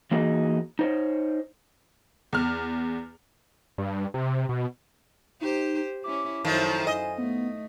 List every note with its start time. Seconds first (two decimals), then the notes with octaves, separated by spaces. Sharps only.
0.11 E3 A#3 D#4 F#4 G#4
0.79 D#4 C5 C#5
2.33 E2 F6
3.78 G2
4.14 C3
4.49 B2
5.41 D#4 G4 C5
6.04 C#4 E4 D6
6.45 F#2 D#3 F3 A3 E4 C5 A5
6.87 D#5 G#5
7.18 A3 B3